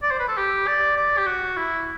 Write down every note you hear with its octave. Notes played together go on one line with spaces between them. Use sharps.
D5
C5
B4
A4
G4
D5
D5
G4
F#4
E4